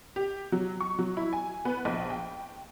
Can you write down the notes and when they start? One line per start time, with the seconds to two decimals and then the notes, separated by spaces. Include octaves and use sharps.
0.16 G4
0.52 F#3
0.81 C#6
0.99 F#3
1.17 E4
1.33 G#5
1.65 B3
1.85 A#1
2.10 G5